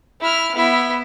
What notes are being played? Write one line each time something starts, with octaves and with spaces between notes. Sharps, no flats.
E4 F6
B3 E4